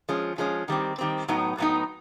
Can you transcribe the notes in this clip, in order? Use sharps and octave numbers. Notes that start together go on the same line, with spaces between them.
F3 G#3 C#4
F3 G#3 C#4
D#3 G3 C4
D#3 G3 C4
A2 F#3 B3 D#4
A2 F#3 B3 D#4